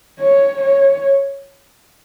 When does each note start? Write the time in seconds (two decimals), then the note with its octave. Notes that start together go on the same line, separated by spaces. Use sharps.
0.19 C#5
0.62 C#5